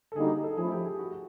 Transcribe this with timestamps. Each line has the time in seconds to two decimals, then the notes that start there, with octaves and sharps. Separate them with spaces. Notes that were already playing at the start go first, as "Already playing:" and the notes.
0.12 A4
0.16 D3 G3 A#3 D#4 F#4 G#4
0.43 A4
0.57 F3 A3 C#4 E4 G#4
0.72 G4
0.85 G#4
0.99 F#4
1.12 F#4